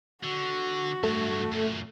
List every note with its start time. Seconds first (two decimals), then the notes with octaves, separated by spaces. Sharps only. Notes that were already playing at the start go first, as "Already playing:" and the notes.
0.24 D3 F#4
1.03 G2 F#3 A3
1.52 F#2 A#2